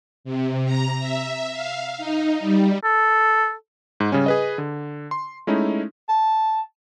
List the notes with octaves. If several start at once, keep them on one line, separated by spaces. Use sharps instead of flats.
C3
A#5
E5
F5
D#4
G3
A4
G#2
C#3 G3 C#4
G#4 B4 D#5
D3
C6
G#3 A3 C#4 D#4 E4
A5